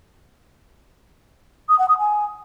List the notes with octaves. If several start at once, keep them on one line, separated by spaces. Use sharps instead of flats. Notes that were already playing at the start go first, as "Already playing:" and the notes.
D#6
F#5
D#6
G#5